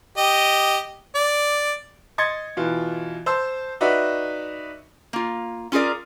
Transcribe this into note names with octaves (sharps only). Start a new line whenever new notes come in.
G4 D#5
D5
D#5 C6 G#6 A6 C#7
B2 E3 F4
C5 A5 C6 E6
D#4 F#4 B4 D5 E5
A#3 F4
C#4 F4 G#4 A#4 D5